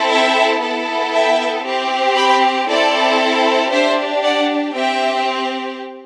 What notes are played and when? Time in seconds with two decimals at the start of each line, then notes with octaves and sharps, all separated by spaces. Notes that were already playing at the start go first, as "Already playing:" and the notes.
Already playing: C4 E4 A4
0.09 E5 G5
0.61 B3 E4 A4
1.13 E5 G5
1.64 C4 G4
2.16 G5 B5
2.68 C4 E4 A4 D5
3.71 D4 G4 C5 E5
4.22 D5 F#5
4.74 C4 G4 E5 G5